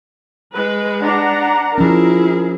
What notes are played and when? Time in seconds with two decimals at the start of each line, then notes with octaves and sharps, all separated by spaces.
0.55 G#3 B4
1.03 D4 F#5 A#5
1.78 F3 C#4 E4 G#4 A#4